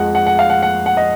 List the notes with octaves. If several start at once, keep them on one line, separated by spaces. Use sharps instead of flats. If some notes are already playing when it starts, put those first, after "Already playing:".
Already playing: F2 F3 G#3 F#5
F#5
F#5
F5
F#5
F#5
F#5
D#5